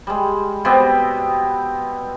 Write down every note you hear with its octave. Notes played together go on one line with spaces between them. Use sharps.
G3 G#3
B2 B3 C4 G4